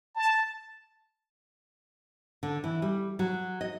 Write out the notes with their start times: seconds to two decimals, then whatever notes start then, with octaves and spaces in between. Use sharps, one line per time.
0.15 A5
2.43 D3
2.64 E3
2.82 G3
3.19 F#3
3.61 D#5